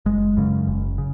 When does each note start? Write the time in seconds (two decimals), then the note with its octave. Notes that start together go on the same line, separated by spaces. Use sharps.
0.06 F#1 G#3
0.37 F#2 C#3
0.67 F#1
0.98 C#3